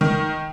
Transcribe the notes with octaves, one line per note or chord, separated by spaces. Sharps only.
D#3